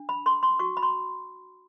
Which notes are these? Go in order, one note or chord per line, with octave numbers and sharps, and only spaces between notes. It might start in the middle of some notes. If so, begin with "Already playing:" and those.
Already playing: D4
B5
A4 C6
C6
F#4 C#6
B5
C6